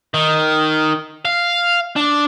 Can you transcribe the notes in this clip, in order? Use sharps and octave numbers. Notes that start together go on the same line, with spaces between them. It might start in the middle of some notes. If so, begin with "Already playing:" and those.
D#3
F5
D4